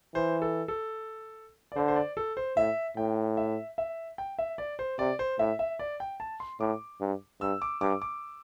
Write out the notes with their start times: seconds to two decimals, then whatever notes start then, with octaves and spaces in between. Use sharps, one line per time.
0.15 E3 C5
0.42 A4
0.68 A4
1.72 D5
1.76 D3 C5
1.88 C5
1.96 D5
2.17 A4
2.37 C5
2.57 A2 E5
2.97 A2 G5
3.37 E5
3.78 E5
4.18 G5
4.39 E5
4.58 D5
4.79 C5
4.99 C3 D5
5.19 C5
5.39 A2 E5
5.59 E5
5.79 D5
6.00 G5
6.20 A5
6.40 C6
6.60 A2 D6
7.01 G2
7.41 G2 E6
7.62 D6
7.81 G2 D6
8.02 D6